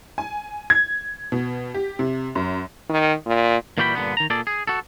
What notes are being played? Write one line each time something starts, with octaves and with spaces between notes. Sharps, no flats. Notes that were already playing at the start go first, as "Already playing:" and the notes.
G#5
G#6
B2
G4
C3
F#2
D#3
A#2
A#2 E3 G3 F#4 G5 B5
G2 A#2 D3 B3
D#3 A#5
A#2 G#4 A4 D5
G#4
F#4 A4